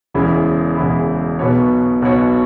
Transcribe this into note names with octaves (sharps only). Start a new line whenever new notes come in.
E1 E2 C#3 G#3 E4
E1 E2 C#3 G#3 E4
B1 B2 B3 F#4 C#5
B1 B2 B3 F#4 C#5